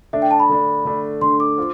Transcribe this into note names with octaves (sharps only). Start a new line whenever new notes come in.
D3 A3 D4 E5
G5
A5
B5
D3 A3 D4
D3 A3 D4
D3 A3 D4 C6
D6
F4 C5